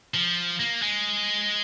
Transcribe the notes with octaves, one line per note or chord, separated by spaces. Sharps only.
F3
A#3
G#3